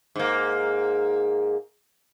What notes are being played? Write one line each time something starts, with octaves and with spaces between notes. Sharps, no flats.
G#2 A#3